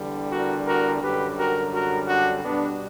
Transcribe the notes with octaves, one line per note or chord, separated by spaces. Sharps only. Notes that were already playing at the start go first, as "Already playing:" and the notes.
Already playing: E2 D3 G3
F#4 A#4
F#4 A#4
F#2 D3 G3 G4 B4
F#4 A#4
F#4 A#4
D4 F#4
B2 G3 B3 D4